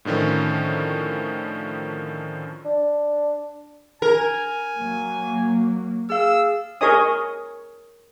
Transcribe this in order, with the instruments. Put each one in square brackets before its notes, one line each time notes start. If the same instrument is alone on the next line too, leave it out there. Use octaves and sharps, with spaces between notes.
[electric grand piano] A2 D3 D#3 F3 C#4
[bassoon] D4
[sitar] A#4 [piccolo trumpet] G#5
[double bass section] F#3 A#3
[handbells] G#4 F5 [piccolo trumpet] E6
[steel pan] G#4 A#4 C#5 D#5 G#5 D#6